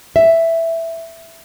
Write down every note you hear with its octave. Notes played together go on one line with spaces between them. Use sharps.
E5